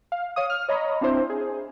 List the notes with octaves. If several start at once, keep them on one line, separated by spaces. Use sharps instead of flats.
F5
C#5 F5 D#6
F6
C#5 D#5 A#5 B5
C4 D4 E4 C5
G#4